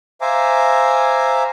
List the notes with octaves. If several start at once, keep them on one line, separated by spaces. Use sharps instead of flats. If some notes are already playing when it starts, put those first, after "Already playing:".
C5 E5 F5 G#5 A#5 D6